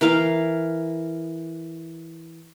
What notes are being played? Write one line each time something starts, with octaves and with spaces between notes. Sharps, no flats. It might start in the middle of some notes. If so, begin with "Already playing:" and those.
E3 A#4 F5